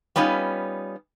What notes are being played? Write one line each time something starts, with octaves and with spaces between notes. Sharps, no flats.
G3 B3 C#4 D#4 F4